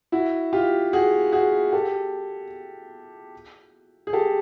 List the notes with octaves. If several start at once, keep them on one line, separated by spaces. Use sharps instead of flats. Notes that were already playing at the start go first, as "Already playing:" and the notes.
E4 F#4
F4 G4
F#4 G#4
F#4 G#4
G4 A4
G#4
G4 A4